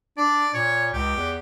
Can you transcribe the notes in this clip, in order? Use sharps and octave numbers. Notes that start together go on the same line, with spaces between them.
D4 D5
A#2 C#5
C#2 G4
E2